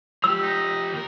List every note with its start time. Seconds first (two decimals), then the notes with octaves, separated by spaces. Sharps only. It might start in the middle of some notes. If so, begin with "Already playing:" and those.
0.24 F3 G4 E6
0.42 D#4
0.93 D#2 A#4